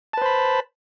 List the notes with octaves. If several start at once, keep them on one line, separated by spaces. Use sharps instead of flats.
B4 C5 A5 B5